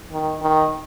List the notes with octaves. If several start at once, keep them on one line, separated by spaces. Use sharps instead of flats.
D#3
D#3